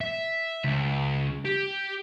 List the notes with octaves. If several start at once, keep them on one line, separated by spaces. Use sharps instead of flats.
E5
C#2
G4